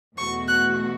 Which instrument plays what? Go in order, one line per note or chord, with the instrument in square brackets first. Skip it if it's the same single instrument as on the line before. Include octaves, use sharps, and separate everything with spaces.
[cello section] E2 B2 A3 F#4 [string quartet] C#6
[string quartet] F#6